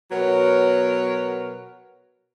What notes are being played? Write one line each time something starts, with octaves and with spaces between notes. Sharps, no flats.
B2 F#3 B3 A#4 C#5 F#5